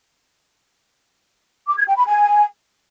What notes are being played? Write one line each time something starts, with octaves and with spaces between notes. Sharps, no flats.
D6
G#6
G5
B5
G#5